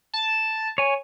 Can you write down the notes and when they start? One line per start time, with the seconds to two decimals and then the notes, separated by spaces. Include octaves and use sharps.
0.14 A5
0.78 C#5 G#5